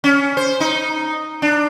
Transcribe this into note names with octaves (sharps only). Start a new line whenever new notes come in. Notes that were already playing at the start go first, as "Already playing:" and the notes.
C#4
C5
D#4
D4